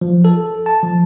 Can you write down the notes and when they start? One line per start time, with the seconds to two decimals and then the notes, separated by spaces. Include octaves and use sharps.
0.01 F3
0.25 A4
0.66 A5
0.83 F3